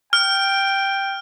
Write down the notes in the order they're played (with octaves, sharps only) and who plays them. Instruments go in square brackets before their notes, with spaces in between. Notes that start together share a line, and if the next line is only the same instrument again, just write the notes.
[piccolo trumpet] G5 [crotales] F6